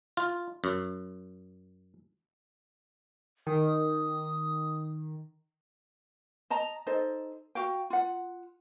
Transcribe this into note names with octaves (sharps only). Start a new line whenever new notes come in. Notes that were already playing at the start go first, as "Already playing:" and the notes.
F4
F#2
D#3 D#6
D#5 A5 A#5
D#4 A4 C5 D#5
F#4 F5 G5
F4 F#5